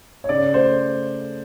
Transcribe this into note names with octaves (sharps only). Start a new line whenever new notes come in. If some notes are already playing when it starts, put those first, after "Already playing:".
C#5
C#3 D5
A3 C5